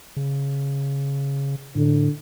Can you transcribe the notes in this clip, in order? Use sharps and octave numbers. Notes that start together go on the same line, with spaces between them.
C#3
A2 D3